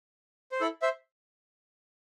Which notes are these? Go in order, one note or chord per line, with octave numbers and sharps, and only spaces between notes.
C5
E4 A4
C5 E5